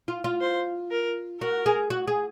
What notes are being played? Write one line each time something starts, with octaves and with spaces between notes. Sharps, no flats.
F4
F4
C5
A#4
F#4 A#4
G#4
F#4
G#4